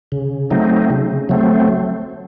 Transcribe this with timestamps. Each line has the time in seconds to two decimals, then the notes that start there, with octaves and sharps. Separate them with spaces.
0.12 C#3
0.51 F#3 A3 C4 D#4
0.90 C#3
1.29 F#3 A3 C4